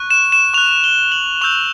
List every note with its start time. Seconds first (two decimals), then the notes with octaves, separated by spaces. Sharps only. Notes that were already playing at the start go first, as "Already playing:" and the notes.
Already playing: C#6 F#6
0.10 E7
0.32 E7
0.54 C#6 F#6 F7
0.84 G7
1.12 F#7
1.41 C#6 E6 G6 F7